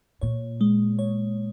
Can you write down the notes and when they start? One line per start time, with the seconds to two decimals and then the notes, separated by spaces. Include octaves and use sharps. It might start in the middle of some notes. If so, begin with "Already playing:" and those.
0.21 A#2 C#5
0.61 G#3
0.99 C#5